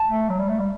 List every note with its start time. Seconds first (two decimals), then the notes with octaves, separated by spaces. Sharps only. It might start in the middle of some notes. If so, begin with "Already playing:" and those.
Already playing: A5
0.08 A3
0.29 F#3
0.38 G3
0.49 A3
0.59 G3